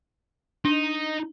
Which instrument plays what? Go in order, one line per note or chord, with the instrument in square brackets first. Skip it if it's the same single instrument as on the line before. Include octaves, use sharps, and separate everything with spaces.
[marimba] D4 [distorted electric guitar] D#4